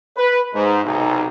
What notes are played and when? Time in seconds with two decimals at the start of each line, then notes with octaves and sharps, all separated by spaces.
0.17 B4
0.53 G#2
0.84 B1 C3 D#4